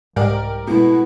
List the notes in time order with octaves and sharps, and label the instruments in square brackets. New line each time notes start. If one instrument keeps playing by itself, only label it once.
[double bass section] C2 [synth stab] G#2 [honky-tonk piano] G4 A#4 D5
[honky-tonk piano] B2 [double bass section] G#3 A3 B3 [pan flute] E4